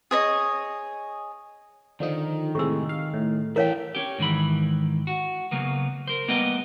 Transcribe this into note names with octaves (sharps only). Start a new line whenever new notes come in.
G#4 C#5 D#5
D3 D#3 F3 D#4
A2 C3 G#3 C#6 E6
F5
A2
F#2 E3 A4 A#4 C#5 E5 F5 G5
C#4 G4
G#2 D#3 E3 B5
F#4
C#3 F#3 A#3 B3
A#4 C5
G3 A#3 B3 G4 B4 D#5